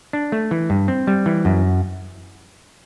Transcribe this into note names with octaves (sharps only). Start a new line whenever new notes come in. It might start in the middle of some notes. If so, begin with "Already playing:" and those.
D4
A3
E3
G2
C4
G3
E3
F#2